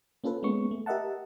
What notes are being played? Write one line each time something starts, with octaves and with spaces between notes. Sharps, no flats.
A#3 C#4 F4 A4 B4
G#3 A#3 B3 C#4 C#6
A3
G4 A#4 D#5 E5 F#5 A5